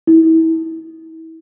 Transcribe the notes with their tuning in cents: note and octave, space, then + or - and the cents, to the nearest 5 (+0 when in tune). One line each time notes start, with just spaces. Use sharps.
E4 -30